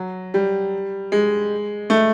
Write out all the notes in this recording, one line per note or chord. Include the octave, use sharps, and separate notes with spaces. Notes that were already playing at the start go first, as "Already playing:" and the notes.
Already playing: F#3
G3
G#3
A3